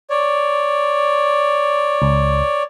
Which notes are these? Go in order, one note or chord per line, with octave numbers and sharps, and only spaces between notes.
C#5 D5
C#2